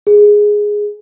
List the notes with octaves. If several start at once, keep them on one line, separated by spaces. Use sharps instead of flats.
G#4